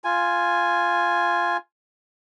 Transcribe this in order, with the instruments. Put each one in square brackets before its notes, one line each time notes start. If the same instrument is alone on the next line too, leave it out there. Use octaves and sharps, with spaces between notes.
[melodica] F4 G#5